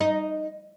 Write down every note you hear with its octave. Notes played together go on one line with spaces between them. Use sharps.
D#4